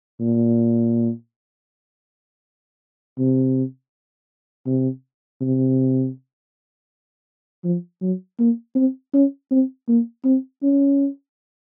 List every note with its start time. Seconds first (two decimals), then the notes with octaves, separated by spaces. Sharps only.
0.20 A#2
3.18 C3
4.66 C3
5.41 C3
7.64 F3
8.02 F#3
8.39 A#3
8.75 C4
9.14 C#4
9.51 C4
9.88 A#3
10.25 C4
10.63 C#4